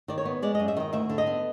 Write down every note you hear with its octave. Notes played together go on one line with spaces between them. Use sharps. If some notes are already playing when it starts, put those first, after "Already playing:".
D#3 D5
C#5
B3
G#3 D5
F#2 D#5
E5
D#3 D#5
D2 E5
D3
D#5
B3